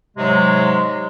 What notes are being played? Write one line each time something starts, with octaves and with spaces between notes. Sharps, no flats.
G#2 C3 F#3 G#3